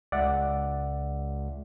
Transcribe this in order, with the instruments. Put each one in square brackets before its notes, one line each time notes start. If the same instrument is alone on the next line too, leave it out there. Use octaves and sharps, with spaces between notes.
[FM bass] C#2 [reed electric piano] D5 E5 F#5